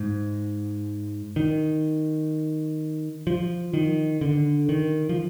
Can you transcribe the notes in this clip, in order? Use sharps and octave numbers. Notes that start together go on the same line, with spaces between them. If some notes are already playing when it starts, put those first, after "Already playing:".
Already playing: G#2
D#3
F3
D#3
D3
D#3
F3